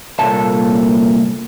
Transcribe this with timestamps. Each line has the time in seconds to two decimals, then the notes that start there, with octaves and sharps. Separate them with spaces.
0.19 C2 A#2 A#3 A4 A5